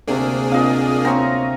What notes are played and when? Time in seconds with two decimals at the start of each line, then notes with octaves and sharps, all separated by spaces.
0.08 D2 C3 A#3 D4 G4 G#4
0.52 C4 F4 D#5 F5
1.05 C4 E4 C#5 G5 A#5 C6 C#6